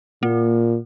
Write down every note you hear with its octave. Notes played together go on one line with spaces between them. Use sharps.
A#2 A#3